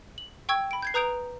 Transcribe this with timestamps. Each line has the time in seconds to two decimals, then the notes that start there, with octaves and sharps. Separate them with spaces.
0.18 F#7
0.49 G5 C#6 E6 G#6
0.71 B5 D7
0.82 G6 G#6 C7
0.94 B4 A#5 D#6 G6 D7 F7